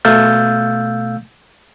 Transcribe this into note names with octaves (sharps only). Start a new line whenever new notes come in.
B2 A3 F5 E6 G6 A6